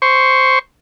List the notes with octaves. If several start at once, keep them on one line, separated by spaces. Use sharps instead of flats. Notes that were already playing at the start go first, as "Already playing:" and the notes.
C5 C#6